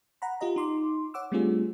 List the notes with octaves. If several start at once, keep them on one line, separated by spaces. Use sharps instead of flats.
F#5 A#5 B5
F4 G4 D#5 A#5
D#4 C6 D6
C#5 F#5 D6 E6
G3 A3 C4 D4 F4 G#4